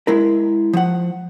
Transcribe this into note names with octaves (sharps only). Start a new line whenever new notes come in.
G#3 E4 A#4
F3 F#5